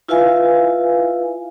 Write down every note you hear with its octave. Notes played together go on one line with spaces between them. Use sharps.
E4 F4 B4 E5 F5 G#5